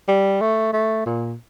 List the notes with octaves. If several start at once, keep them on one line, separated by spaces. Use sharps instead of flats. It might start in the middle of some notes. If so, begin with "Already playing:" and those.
G3
A3
A3
A#2